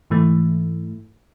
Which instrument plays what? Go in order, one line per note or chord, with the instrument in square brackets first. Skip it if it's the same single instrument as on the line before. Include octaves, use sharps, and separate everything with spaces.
[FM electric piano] G#2 E3 A3